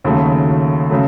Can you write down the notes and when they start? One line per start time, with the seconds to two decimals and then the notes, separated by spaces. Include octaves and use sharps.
0.04 D#2 C#3 F#3 A3
0.91 C#3 F#3 A3